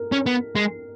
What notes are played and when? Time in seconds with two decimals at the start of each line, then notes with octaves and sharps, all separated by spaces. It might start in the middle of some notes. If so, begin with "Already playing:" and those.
Already playing: A#4
0.12 C#4
0.26 B3
0.56 G#3